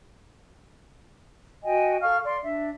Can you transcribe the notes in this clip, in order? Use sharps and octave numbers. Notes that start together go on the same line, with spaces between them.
F#4 D#5 G5 G#5
A4 F5 C#6 F6
D5 C6
D4 E5